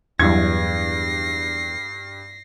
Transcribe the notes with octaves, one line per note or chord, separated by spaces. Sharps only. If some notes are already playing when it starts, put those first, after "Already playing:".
E2 G2 F#3 E4 G#6 A#6 C7